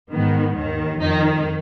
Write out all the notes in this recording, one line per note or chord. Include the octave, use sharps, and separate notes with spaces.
G#2 D#3 B3
D#2 D#3
F2 D#3 D#4